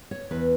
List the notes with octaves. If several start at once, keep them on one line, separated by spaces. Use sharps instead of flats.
C#5
E2 B4